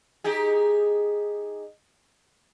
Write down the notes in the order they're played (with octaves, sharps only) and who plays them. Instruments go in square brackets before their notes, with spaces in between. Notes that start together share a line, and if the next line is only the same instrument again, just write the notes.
[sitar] D#4 G4 G#4